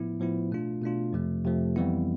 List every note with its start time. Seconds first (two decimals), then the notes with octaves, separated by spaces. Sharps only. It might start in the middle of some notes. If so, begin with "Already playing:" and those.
Already playing: A2 F3 B3 E4
0.20 A2 F3 B3 E4
0.52 B2 A3 D4 F4
0.82 B2 A3 D4 F4
1.13 F2 C3 F3 A3
1.44 F2 C3 F3 A3
1.76 F2 E3 G3 B3 E4